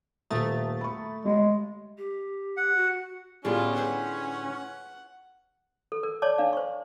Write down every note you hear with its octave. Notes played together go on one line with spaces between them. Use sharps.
D#1 A3 A#5 D#6 A6
B5 C#6
G3 G#3
G4
F#5
F#4
A2 D3 G3 B3 C#4 E4 F4 G#4
G#4 B4 C5 F#5
A4
A#4
C#5 D5 A5 D6
D4 F5
C5 C#6